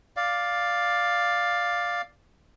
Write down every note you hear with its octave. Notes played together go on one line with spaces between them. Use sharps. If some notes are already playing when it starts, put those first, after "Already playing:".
D5 F5